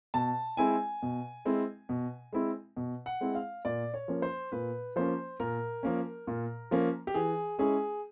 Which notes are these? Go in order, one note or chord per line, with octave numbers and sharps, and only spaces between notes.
B2 A5
G#3 C4 E4 G#5
B2
G#3 C4 E4
B2
G#3 C4 E4
B2
F#5
G#3 C4 E4
F5
A#2 D5
C#5
F3 A#3 C#4
C5
A#2 B4
F3 A#3 C#4 C5
A#2 A#4
F3 A#3 C#4
A#2
F3 A#3 C#4
G4
E3 G#4
G#3 C#4 E4 G#4